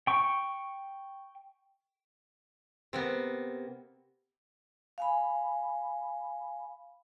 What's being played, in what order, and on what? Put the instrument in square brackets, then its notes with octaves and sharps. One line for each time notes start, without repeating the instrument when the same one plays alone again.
[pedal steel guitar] G5 C#6
[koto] C3 A#3 B3
[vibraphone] F5 G#5 B5